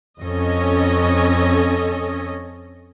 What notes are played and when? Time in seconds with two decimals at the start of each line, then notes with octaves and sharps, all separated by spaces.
0.20 F2 C#4 A4 D#5